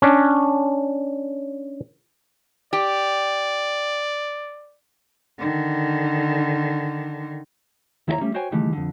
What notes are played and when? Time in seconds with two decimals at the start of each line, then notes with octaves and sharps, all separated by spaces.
0.02 C#4 D4
2.73 G4 D5
5.38 D3 D#3
8.08 D#2 E4 G4 C#5 A#5
8.21 G3 A3 C#4
8.34 F#4 C5 C#5 G5 G#5
8.51 C#2 D#3 E3 G3 A3
8.73 F2 D3